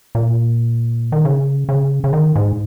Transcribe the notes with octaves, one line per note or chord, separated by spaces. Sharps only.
A#2
D#3
C#3
C#3
C#3
D#3
G#2